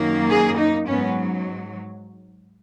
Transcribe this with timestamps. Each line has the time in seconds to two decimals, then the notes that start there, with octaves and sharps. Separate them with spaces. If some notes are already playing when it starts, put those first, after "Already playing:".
Already playing: F#2 D#3 A#3
0.31 G#4
0.59 D#4
0.87 G#2 F#3 B3 C#4